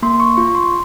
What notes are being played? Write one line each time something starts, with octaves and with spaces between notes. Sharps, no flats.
A#3 C6
C#6
F4 C#6
C6